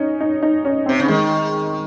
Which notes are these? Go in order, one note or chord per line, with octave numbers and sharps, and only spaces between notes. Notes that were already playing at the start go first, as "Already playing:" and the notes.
Already playing: C#4 D#4
D#4
D#4
C#4
C4
C3
C#3
D#3 G#3